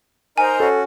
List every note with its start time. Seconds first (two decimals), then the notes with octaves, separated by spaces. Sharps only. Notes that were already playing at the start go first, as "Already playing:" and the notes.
0.38 D#4 A#4 C5 D#5 G#5 A#5
0.60 C#4 F#4 A4